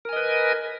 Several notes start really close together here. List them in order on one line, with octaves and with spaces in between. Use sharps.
A#4 G#5 D#5 B4